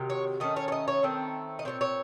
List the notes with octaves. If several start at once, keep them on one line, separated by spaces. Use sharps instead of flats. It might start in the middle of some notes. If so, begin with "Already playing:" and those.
Already playing: C3 D#3 F#3
C#5
D#3 A3 C#4 D#5
C#5
C#5
D#5
C#5
D#3 A3 C4
D#5
A#2 F#3 C4 C#5
C#5